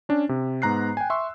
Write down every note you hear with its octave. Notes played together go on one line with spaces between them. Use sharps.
C#4 D4
C3
G#2 B3 A#5 F#6 C7
G5 G#5
E5 C6 C#6 E6